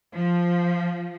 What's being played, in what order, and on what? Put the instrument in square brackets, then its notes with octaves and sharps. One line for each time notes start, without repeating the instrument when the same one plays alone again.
[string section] F3